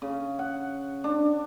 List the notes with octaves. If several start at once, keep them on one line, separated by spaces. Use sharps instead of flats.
C#3
F#5
D4